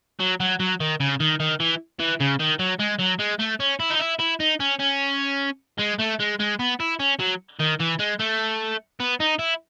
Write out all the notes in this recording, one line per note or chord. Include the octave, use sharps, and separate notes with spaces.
F#3
F#3
F#3
D#3
C#3
D#3
D#3
E3
E3
C#3
D#3
F#3
G#3
F#3
G#3
A3
C#4
E4
D#4
E4
E4
D#4
C#4
C#4
G#3
A3
G#3
G#3
B3
E4
C#4
F#3
D#3
E3
G#3
A3
B3
D#4
E4